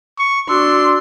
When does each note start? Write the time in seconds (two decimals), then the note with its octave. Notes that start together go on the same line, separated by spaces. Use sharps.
0.18 C#6
0.49 D4 F#4 C6 E6